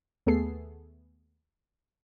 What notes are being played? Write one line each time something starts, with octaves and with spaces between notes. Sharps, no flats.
D#2 A3 B3 G#4 A4 C7